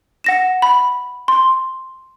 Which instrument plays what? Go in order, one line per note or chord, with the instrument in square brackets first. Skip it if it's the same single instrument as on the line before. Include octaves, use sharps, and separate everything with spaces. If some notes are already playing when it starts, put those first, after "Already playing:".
[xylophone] F#5 A#6 E7
B5
C6